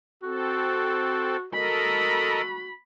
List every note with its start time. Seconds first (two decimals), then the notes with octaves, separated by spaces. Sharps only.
0.23 C4 F#4 A4
1.53 F#4 A4 A#4 D#5 B5